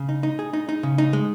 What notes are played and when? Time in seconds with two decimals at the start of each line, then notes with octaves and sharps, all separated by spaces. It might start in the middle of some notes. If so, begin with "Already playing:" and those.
Already playing: C#3
0.09 D#4
0.23 D#4
0.39 G#4
0.53 D#4
0.69 D#4
0.83 C#3
0.98 D#4
1.13 G#3